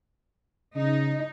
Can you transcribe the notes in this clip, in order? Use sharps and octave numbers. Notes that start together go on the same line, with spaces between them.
C#3 D#4